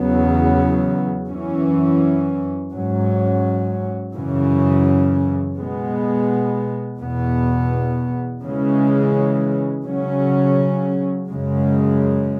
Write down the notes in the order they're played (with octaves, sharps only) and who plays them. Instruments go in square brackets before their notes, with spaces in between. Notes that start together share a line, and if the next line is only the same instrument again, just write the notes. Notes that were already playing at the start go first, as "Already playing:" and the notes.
Already playing: [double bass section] E2 C#3 F#3 B3
F#2 E3 C#4
G#2 F#3 C#4
F#2 C#3 E3 C#4
B2 G#3 B3
E2 B2 B3
C#3 E3 G#3 C#4
C#3 F#3 C#4
F#2 C#3 G#3